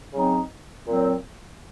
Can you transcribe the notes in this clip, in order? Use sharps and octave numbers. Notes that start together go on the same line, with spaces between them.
C#3 F#3 C4 D#4
A#2 F#3 C4